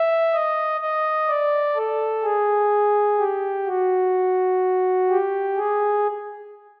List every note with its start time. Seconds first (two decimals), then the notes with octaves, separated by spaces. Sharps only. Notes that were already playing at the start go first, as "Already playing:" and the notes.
Already playing: E5
0.33 D#5
0.81 D#5
1.28 D5
1.76 A4
2.24 G#4
3.19 G4
3.66 F#4
5.09 G4
5.57 G#4